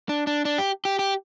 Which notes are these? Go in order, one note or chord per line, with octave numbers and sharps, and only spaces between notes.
D4
D4
D4
G4
G4
G4